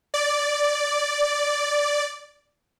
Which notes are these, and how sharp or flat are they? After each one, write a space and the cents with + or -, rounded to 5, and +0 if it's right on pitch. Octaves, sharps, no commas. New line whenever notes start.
D5 -5